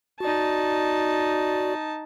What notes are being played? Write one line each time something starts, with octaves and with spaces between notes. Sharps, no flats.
D#4 F#4 D5 A5